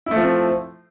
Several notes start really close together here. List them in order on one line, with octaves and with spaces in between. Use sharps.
E4 A3 F3 C4